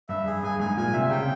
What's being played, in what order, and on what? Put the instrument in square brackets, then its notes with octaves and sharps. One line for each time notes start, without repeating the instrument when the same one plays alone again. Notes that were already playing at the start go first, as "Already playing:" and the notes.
[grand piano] G2 [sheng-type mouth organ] E5
[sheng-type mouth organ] G#4
[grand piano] G2 [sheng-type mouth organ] G#5
[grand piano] G#2 [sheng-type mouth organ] G#5
[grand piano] A#2 [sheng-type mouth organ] G#5
[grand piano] C3 [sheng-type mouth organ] E5
[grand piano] C#3 [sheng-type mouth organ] G5